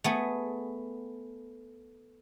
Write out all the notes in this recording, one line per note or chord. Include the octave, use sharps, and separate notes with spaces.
A3 B3 G#4